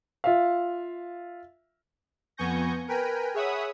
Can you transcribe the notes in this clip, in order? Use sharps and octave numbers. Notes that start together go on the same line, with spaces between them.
F4 E5 F5
F2 B3 G#5 C#6 G6 A#6
A#4 B4 G5 G#5
G#4 C#5 E5 F#5 B5 D#6